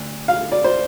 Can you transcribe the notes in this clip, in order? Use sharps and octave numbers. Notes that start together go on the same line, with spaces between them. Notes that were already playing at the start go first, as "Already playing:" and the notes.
Already playing: D2
F5
D5
C5